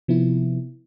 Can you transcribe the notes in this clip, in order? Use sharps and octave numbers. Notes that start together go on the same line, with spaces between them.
C3 F3 B3 E4